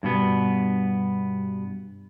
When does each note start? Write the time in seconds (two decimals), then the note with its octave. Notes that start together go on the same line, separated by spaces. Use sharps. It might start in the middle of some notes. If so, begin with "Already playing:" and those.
0.03 G2 B2 B3